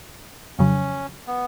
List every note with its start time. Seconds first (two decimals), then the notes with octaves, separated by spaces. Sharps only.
0.58 F2 C#3 F#3 C#4
1.27 B3